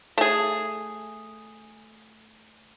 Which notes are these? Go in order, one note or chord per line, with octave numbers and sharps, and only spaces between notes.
A3 G#4